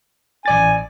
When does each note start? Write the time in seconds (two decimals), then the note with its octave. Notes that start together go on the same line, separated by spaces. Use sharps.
0.46 A1 D5 G#5 A6